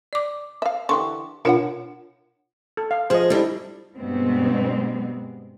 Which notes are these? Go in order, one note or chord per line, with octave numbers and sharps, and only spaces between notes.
D5 D6
E5 F5
D3 E3 G4 C6 C#6
B2 D4 F4 A#4 C#5 F#5
A4
F5
F3 G#4 C5 D#5
G3 D4 E4 A4
G2 B2 G3 G#3 B3 C4